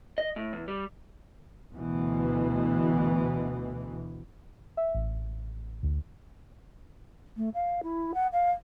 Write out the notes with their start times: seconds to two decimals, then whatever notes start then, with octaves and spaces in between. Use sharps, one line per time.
0.18 D#5
0.36 A2
0.53 E2
0.68 G3
1.75 D2 B2 E3
4.77 E5
4.95 A1
5.83 D2
7.37 A3
7.54 F5
7.83 E4
8.14 F#5
8.33 F5